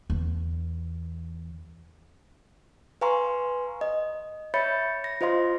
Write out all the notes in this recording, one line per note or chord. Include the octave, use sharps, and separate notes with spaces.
E2
B4 F5 G#5 A#5 C6 C#6
D#5
C#5 E5 B5 G6 A6 C#7
A#6
F4 C5 D#5 F5 C6